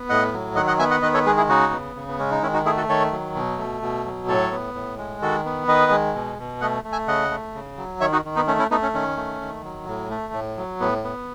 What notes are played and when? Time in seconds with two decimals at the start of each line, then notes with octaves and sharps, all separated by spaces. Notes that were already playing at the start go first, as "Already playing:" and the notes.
Already playing: B3
0.09 A2 D#5 F#5
0.33 F#3
0.55 D#3 D#5 F#5
0.67 D#5 F#5
0.79 B3 E5 G#5
0.91 D#5 F#5
1.02 D#3 B4 D#5
1.14 A4 C#5
1.26 G#3 G#4 B4
1.37 E4 G#4
1.49 C#3 D#4 F#4
1.72 B3
1.96 C#3
2.08 B3
2.19 G#3 C#4
2.31 D#4
2.42 D#3 C#4 E4
2.53 D#4 F#4
2.65 A3 E4 G#4
2.77 F#4 A4
2.89 D#3 A4 C#5
3.12 F#3
3.36 B2
3.58 A3
3.82 B2
4.06 F#3
4.28 A2 A4 C#5
4.52 B3
4.74 A2
4.98 G#3
5.22 D#3 F#4 A4
5.45 B3
5.68 D#3 B4 D#5
5.91 G#3
6.15 B2
6.38 B2
6.61 A3 D#5 F#5
6.84 A3
6.92 E5 G#5
7.08 C#3 D#5 F#5
7.31 A3
7.55 C#3
7.77 F#3
8.00 D#3 C#5 E5
8.12 D#4 F#4
8.25 D#3
8.36 B3 D#4
8.47 A3 C#4
8.59 C#4 E4
8.71 A3 B3 D#4
8.82 C#4
8.94 D#3 C#4
9.17 A3
9.41 D#3
9.64 F#3
9.87 A2
10.10 A3
10.33 A2
10.57 F#3
10.80 A2 B3
11.04 B3